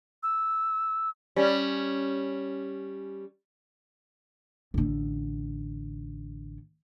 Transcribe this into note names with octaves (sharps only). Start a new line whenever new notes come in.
E6
G3 C#4
A1 D3